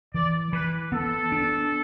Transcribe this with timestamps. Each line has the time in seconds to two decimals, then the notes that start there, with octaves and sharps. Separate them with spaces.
0.14 E3 D5
0.53 E3 B4
0.92 B3 A4
1.32 D4